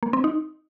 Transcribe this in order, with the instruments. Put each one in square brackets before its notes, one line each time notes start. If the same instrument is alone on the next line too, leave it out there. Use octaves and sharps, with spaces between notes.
[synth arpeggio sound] A#3
C4
D#4